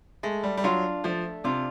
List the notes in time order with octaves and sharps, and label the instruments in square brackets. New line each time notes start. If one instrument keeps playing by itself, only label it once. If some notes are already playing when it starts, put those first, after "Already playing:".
[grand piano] G#3 [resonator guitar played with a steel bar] A3
[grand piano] G3
G3
[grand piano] F#3 [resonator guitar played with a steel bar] D4 F4
[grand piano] F3 [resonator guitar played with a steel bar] A3
[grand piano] C3 [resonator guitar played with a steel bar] D4 F4